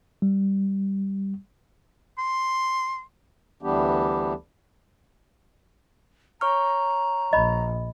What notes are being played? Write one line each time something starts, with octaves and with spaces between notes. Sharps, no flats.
G3
C6
D2 E3 G3 B3 D4 G4
C#5 A#5 C#6 F6
A#1 D#5 B5